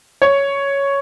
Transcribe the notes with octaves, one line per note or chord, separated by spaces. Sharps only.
C#5